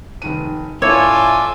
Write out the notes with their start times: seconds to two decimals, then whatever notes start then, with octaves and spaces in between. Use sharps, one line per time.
0.22 F1 D#3 D#7
0.82 A2 A3 C#4 F4 C#5 D5 G#5 E6